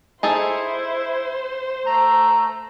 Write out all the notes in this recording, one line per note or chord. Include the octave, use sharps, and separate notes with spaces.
D#4 E4 G#4 A4 C5
A3 A#5